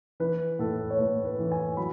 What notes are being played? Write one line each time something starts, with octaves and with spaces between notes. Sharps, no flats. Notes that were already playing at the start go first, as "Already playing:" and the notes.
E3 B4
A2 A4
C#5
A2 B4
B4
E3
G#5
F#3 B5